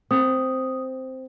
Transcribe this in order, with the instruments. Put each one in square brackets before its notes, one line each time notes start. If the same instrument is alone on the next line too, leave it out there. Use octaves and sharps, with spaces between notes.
[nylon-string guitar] C4 [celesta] D#6